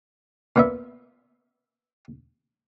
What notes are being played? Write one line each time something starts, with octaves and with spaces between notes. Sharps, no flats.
A#2 B3 E5